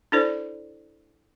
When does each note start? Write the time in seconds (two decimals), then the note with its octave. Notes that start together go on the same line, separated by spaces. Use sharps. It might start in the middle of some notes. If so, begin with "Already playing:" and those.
0.12 D4 E4 A4 C5 D5